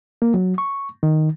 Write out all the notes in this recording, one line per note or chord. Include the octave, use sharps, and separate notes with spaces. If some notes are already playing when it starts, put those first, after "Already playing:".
A#3
F#3
C#6
D#3